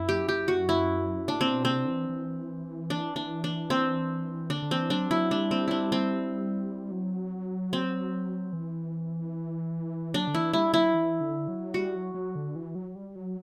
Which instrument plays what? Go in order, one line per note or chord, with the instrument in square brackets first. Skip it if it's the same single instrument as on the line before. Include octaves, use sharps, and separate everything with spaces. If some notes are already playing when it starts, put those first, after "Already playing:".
Already playing: [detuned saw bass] F#2 [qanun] E4
[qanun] G4
G4
F#4
E4
[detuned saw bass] A2 [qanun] D4
[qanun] C4
[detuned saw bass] B2
[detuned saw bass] C3 [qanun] C4
[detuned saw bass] D3
E3
E3
[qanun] D4
D4
D4
C4
[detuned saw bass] D3 [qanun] D4
[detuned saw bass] D3
[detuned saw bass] E3 [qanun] C4
[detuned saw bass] F#3 [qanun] D4
[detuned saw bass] F#3 [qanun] E4
[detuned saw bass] G3 [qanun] D4
[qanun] C4
D4 E4
C4
[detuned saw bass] F#3
[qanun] C4
[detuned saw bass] E3
[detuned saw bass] F#3 [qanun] D4
[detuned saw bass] D3
[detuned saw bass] E3 [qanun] E4
[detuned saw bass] G3 [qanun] E4
[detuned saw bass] F#3 [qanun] E4
[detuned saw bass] E3
D3
F#3
[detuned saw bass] G3 [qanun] F#4
[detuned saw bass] F#3
F#3
D3
E3
F#3
G3
F#3